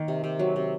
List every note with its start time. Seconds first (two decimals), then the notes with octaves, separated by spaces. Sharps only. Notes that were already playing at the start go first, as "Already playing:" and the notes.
Already playing: D#3 A#3
0.08 C3
0.24 C3
0.39 F#3
0.56 C3